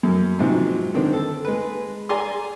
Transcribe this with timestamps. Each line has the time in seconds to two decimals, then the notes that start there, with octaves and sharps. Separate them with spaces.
0.03 F#2
0.39 G#2 C3 F3 F#3
0.94 D3 D#3 C4
1.13 A4
1.45 G#3 B4
2.09 G#4 D5 G#5 A#5 C6